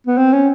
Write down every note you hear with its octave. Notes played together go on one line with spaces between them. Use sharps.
B3
C4
C#4